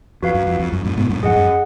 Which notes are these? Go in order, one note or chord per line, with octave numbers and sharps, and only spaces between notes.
F2 F#4 B4 F5
F#2
F2
F2
F#2
F#2 A#2
G#2 B2
F#2 A#2
F2 G#2 G#4 D#5 F#5
F#2